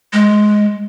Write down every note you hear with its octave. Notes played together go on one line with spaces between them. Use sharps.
G#3